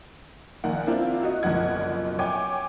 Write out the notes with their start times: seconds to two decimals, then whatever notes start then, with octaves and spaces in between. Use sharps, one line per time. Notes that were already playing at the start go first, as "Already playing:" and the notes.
0.64 A#1 D#3 A#3 F#5 G#5
0.87 A#3 C4 D4 E4 F4
1.23 F#4 D#5
1.43 F#1 B1 D3 F3 F#5 G#6
2.19 C#5 E5 G5 G#5 D6 G#6